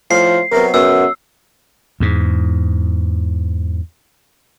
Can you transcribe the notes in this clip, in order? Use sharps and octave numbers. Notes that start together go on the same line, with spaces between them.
A2 F3 F5 C7
C3 F#3 B3 A#4
F#2 C#3 B3 E6
E2 G#2